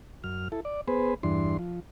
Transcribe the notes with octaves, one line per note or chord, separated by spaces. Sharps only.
F#2 F6
E4 A4
D5
B3 G#4 B4 C5
E2 G2 E3 D4 C6
F3